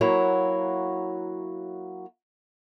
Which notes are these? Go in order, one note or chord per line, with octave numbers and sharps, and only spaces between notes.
F#3 A#3 E4 F#4 C#5